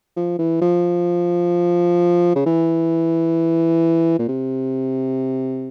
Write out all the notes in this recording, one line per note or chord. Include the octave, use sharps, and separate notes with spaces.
F3
E3
F3
C#3
E3
A#2
C3